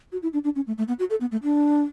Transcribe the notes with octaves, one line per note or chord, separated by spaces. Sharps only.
F#4
E4
D4
D4
C#4
A3
A3
B3
F#4
A4
B3
A3
D4